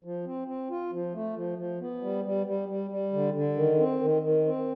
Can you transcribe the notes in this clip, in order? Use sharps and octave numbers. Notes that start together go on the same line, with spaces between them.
F3
C4
C4
F4
F3
A3
F3
F3
B3
G3
G3
G3
G3
G3
D3
D3
D#3
C4
D#3
D#3
C4